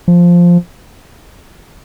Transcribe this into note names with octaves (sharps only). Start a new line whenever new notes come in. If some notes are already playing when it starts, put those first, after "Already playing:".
F3